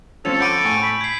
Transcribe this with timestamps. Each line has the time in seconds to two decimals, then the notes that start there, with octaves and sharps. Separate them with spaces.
0.25 F3 C4 C#4 A4 F7
0.40 F#5 B5 D6 G6 D7 D#7
0.64 A2 G#5 C#6
0.82 B5
1.01 G#6 C7